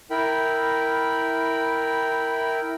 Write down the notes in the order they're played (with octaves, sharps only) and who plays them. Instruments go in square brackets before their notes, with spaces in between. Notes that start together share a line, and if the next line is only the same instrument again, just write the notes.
[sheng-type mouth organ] E4 A#4 G5 B5